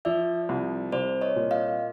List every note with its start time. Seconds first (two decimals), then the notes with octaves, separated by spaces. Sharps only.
0.05 F3 D5 E5
0.49 C2
0.92 C2 C5 D5
1.21 C#5 D#5
1.36 A#2
1.51 D#5 F5